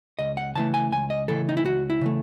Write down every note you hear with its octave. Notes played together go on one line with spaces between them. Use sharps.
C#2 D#5
F#5
C#3 E3 A3 A5
G#5
C#2 G#5
D#5
C#3 E3 A3 A4
D#4
E4
C#2 F#4
E4
C#3 E3 A3